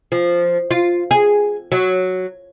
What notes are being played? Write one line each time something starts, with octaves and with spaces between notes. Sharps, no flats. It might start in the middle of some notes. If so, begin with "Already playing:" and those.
F3
F4
G#4
F#3